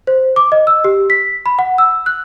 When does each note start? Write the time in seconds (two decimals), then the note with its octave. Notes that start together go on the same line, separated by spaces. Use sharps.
0.07 C5
0.36 D6
0.52 D#5
0.67 E6
0.84 G4
1.10 B6
1.46 B5
1.59 F#5
1.78 E6
2.06 F#6